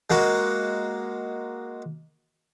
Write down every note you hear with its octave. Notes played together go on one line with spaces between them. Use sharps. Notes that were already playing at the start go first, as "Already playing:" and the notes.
G#3 A#3 F#4